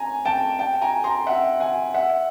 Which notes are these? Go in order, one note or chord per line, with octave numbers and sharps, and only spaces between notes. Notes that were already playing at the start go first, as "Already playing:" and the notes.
Already playing: G#5 A#5
G5 A5
G5 A5
G#5 A#5
A#5 C6
E5 F#5
F#5 G#5
E5 F#5